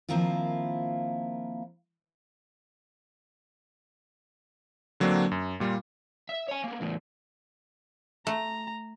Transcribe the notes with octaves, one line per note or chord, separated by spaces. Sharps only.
D#3 F3 A#3 C4 E4 F4
D3 F#3 A#3 C4 D4
F#2
A#2 G3 F4
E5
C#5 G#5
A#3 B3
E2 A2
A3 A#5